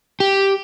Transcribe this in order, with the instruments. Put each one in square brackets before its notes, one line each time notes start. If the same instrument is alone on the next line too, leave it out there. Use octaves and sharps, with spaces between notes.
[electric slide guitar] G4